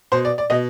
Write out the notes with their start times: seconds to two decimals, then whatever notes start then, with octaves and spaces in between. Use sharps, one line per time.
0.12 B2 C5
0.25 D5
0.38 D5
0.50 B2 D#5